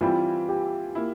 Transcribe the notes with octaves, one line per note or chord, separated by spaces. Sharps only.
E3 G3 C4 E4 F4
G4
A#3 E4